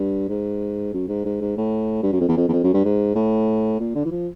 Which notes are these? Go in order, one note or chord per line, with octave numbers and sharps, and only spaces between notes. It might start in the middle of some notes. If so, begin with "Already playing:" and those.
Already playing: G2
G#2
F#2
G#2
G#2
G#2
A2
G2
F#2
F2
E2
F2
E2
F2
F#2
G2
G#2
A2
A#2
D3
E3
F3